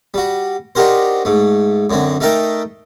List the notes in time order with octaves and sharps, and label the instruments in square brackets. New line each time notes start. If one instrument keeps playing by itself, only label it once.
[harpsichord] G3 F#4
D4 D#4 F#4 G4 A#4 C5
G#2 A3
F#2 D3 C4
A3 D#4 A#4 E5 G5 A5